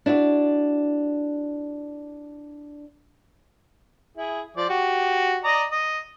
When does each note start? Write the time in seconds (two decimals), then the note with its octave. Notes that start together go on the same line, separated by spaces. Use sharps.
0.06 D4 E4 F#4 D5
4.17 E4 G#4
4.57 F3 D5
4.69 F#4 G4
5.44 D5 D#5 A#5
5.71 D#5